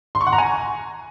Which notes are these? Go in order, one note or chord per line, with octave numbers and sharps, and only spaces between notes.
C6
C#6
F#5
A#5
G#5